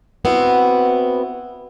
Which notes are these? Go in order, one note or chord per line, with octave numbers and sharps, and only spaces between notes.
B3 C4 E4 F#4